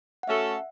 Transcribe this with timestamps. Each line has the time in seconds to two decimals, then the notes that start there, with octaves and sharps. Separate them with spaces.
0.23 F#5
0.28 A3 C#4 F#4 A4 E5